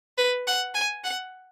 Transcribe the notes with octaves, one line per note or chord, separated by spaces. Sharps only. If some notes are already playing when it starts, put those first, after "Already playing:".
B4
F#5
G#5
F#5